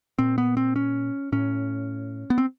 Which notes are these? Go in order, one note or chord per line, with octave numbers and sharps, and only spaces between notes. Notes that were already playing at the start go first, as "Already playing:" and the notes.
A#2 C4
B3
C4
C#4
A2 C#4
B3
C4